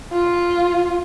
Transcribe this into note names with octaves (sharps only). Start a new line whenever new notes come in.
F4